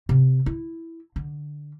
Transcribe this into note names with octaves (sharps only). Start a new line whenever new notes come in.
C3
E4
D3